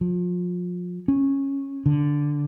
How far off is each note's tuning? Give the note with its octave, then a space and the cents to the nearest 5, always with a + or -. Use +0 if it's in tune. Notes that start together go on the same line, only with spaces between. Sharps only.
F3 +30
C#4 -10
D3 -5